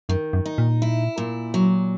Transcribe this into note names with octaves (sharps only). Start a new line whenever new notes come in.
F#2 D#3
F#2
D#4
A#2
E4
A#2
F#3